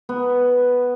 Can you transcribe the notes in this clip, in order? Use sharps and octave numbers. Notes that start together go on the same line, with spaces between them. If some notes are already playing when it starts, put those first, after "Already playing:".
B3